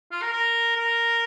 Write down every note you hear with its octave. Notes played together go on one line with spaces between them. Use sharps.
F4
A#4
A#4
A#4